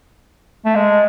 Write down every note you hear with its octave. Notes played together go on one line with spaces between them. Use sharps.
A3
G#3